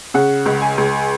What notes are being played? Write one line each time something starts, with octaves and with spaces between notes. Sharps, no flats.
C#3 F#5
C#2
G#5
C#2